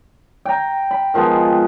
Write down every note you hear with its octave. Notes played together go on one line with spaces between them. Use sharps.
G5 A#5
B5
D#3 F3 G#3 B3